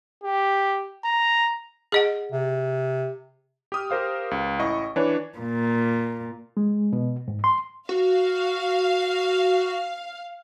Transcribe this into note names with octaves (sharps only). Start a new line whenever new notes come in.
G4
A#5
G#4 D#5 F#5
C3
G4 D#6 F6
G4 A#4 C5 F5 D#6
C#2
A1 E4 D#5 C#6
E3 D4 B4 C#5
A#2
G#3
B2
G#2
C6
F#4 F5